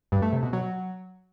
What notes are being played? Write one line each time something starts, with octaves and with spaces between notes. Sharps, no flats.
G2
A3
C3
B2
F#3